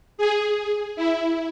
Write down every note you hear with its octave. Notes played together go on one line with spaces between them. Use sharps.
G#4
E4